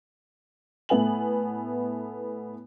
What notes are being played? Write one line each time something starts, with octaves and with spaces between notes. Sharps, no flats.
A2 A3 B3 G#5 F#7